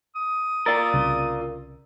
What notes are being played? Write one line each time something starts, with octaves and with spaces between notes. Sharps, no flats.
D#6
F4 A#4 D5 E6 A6
C2 C#3